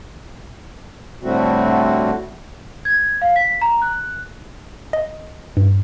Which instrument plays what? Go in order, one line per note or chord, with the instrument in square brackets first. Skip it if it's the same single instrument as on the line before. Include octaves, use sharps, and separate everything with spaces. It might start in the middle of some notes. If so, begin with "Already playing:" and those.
[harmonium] A2 D3 G3 A3 C4 F#4
[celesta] G#6
F5
B6
A#5
F#6
[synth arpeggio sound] D#5
G2